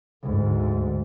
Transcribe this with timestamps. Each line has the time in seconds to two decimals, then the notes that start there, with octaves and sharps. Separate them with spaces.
0.23 D2 G#2